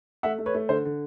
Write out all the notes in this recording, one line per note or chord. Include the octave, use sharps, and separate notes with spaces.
A3 E5 F#5
A3
B4 C#5
A3
D3 C5
D3